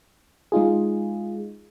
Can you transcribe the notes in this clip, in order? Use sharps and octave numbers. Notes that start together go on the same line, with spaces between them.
G#3 D#4 F4 G#4